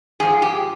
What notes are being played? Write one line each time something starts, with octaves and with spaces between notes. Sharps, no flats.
G#2 F3 G#4
G4